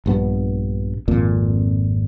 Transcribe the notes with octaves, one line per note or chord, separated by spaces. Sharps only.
A#1 G2 B3
G#1 F2 A#2